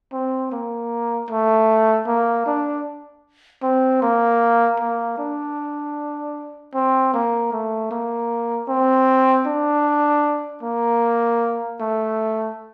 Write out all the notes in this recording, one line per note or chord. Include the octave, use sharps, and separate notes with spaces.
C4
A#3
A3
A#3
D4
C4
A#3
A#3
D4
C4
A#3
A3
A#3
C4
D4
A#3
A3